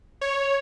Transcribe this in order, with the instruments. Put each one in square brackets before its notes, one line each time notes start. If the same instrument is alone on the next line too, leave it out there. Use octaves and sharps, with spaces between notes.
[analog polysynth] C#5